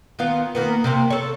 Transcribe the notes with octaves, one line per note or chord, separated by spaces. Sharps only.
D#3 B3 F4
D#3 A#3 B3
C3 A#3 C4
A4 C#5